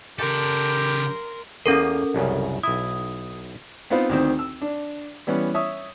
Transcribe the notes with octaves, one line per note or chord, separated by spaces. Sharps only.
C#3 G4 A4 A#4 C6
E2 A#3 C#4 A4 A#4
C2 F#2 C#3
B1 E4 D#6
B3 C4 D#4 F4 B4 C5
D2 D#3 C4
E6
D4
E3 G3 B3 C#4
C#5 E5 D#6